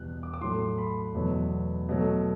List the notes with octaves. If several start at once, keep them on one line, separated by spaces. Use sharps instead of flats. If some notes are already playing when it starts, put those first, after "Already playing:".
Already playing: E2 B2 G3 F#6
D6
D6
A2 F#3 A3 C6
B5
E2 B2 F#3 A3
B2 F#3 A3